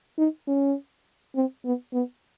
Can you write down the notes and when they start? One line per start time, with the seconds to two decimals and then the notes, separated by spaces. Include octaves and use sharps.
0.19 D#4
0.48 C#4
1.36 C4
1.65 B3
1.94 B3